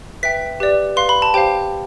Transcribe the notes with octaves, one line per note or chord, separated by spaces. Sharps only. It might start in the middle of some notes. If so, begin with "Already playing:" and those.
B4 E5 G5 B6
G4 B4 D5
B4 F5 C6
B5
A5
G4 C5 F5 G5